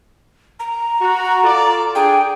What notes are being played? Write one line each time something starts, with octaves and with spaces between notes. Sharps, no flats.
A#5
F#4
F4 A4 D5
D4 G#4 G5